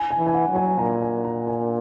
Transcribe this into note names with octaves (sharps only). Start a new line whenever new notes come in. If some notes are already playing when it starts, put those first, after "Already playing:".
Already playing: G#5
G#5
E3
G#5
F#5
F#3
G#5
A#2 A#5
G#5
A#5
G#5